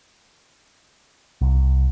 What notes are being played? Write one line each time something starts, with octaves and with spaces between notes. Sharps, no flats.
C2